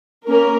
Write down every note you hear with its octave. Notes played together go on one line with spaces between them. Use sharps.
A#3 C#4 A#4